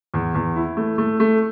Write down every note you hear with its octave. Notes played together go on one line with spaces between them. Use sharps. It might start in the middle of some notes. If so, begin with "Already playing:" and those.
E2
E2
E4
A3
A3
A3